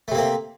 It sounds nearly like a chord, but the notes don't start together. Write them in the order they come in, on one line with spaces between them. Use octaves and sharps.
A3 C3 A#3 C4